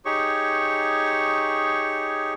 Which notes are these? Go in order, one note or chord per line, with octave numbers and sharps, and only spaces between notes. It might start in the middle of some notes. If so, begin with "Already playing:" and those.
D#4 G4 G#4 C#5 C#6